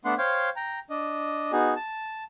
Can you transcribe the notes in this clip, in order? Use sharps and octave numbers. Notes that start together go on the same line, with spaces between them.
A3 B3 D4 F#5 C6
C5 C#5 F5 G5
G5 A#5
D4 D#5
B3 D#4 F#4 G#4
A5